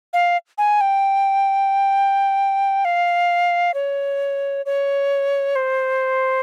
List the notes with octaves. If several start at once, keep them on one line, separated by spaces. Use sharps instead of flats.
F5
G#5
G5
F5
C#5
C#5
C5